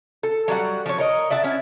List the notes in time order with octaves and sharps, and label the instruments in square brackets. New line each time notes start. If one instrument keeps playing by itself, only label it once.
[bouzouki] A4
F#3 G3 F#5
F3 C#5
A#4 C#5 D#5
D5 E5 F#5 A5
C#4 E4